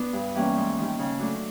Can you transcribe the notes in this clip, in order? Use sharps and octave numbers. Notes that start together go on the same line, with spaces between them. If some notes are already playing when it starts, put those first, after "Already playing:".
Already playing: B3 D4
G2
E3 G3 A#3 C#4
G#2
D#3 G3
C#3
F#3 A3 D4